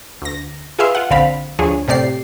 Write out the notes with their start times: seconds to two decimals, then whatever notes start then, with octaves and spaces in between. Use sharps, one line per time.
0.22 D2 A#6
0.79 F4 G#4 B4 E5 F5 C6
0.95 F4 F#5
1.10 A#1 D3 C4 F5 B5
1.59 D2 D3 F3 G#4 C#5
1.88 A2 C3 G4 D5 C7